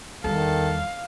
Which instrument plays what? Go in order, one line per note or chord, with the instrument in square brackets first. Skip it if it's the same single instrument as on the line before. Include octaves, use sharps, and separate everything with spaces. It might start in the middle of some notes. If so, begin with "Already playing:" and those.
[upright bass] E2 G3 [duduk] D#3 [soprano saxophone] A4 [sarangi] F5